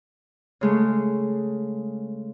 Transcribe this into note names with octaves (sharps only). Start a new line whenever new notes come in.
C#3 G#3 A3